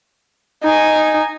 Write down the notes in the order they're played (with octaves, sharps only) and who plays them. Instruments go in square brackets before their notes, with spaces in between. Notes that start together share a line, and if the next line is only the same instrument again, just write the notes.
[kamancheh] D#4 G#5